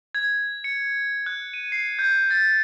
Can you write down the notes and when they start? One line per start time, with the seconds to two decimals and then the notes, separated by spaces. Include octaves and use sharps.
0.15 G#6
0.64 C#7
1.26 F#6
1.54 D#7
1.72 C7
1.99 G6
2.30 A6